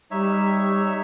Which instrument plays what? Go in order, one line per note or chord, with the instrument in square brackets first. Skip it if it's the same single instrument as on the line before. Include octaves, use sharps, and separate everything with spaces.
[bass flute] G3 [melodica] D#4 C#5 E5